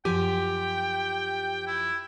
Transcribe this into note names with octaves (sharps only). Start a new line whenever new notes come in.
F#2 F3 G4 G5 G#5
E4